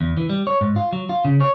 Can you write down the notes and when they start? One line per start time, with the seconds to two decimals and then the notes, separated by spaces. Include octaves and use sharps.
0.01 E2
0.17 E3
0.30 G3
0.47 C#5
0.61 G#2
0.76 F4
0.93 F#3
1.09 F4
1.25 C#3
1.40 C#5